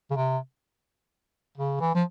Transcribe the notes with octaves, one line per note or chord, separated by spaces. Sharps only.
C#3
C3
C#3
E3
F3